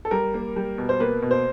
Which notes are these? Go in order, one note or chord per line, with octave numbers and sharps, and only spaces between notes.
A4
G3 A#4
A#3
G3
B2
C5
A#3 B4
B2
C5